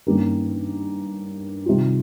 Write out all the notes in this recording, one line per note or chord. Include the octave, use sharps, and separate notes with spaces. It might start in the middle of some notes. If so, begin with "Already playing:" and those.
G2 D#3 A#3 C#4 G4
C3 D#3 G3 C4 F4